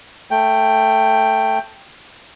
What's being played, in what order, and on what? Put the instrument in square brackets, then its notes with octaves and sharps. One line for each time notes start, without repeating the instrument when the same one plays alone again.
[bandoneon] A3 G5